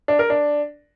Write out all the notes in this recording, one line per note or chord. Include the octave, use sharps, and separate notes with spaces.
D4
A#4
D4